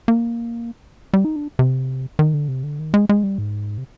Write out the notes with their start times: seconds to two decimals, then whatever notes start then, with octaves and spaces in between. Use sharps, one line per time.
0.08 A#3
1.13 G3
1.25 D#4
1.36 D4
1.59 C3
2.19 D#3
2.33 D3
2.48 C3
2.63 D3
2.79 D#3
2.94 G#3
3.09 G#3
3.24 G3
3.38 G#2
3.78 C3